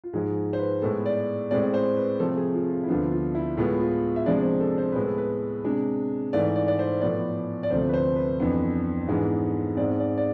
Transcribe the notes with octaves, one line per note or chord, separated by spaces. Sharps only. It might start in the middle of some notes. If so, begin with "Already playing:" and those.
F4
G#2 F3 G#3 G#4
C5
B4
A2 G#3 B3 A4
D5
A2 G#3 C4 D5
C5
B4
C3 F3 A3 C4 A4
G#4
F4
F4
E4
D2 D3 F3 B3 D4 F4
F4
E4
A2 G#3 B3 F4
F4
E5
C3 F3 G#3 D4 D5
C5
A4
C5
A2 G#3 B3 B4
A4
B4
C3 G#3 D4
G#2 E3 A3 D5
D5
D5
C5
A2 F3 B3 D5
D5
D2 C3 F3 A3 C5
B4
C5
B4
F2 E3 B3 D4
G#2 E3 G#3 B3 D4
G#2 G#3 C4 D5
D5
D5